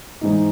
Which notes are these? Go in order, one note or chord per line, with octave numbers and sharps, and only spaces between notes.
G#2 E3 G#3 D#4